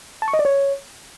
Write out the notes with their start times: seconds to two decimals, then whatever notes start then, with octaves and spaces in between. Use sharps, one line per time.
0.22 A5
0.28 C#6
0.33 D#5
0.39 D5
0.45 C#5